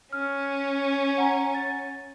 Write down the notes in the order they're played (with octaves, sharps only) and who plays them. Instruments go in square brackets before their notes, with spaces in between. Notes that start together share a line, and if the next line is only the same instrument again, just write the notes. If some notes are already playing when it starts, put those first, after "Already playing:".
[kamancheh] C#4 [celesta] F6
[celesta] F#5 G#5 A#5
A6